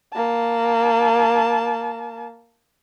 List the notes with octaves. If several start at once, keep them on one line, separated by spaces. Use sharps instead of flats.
A#3 A5